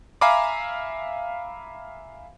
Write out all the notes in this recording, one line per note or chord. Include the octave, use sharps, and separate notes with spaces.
E5 F5 G#5 A#5 B5 D6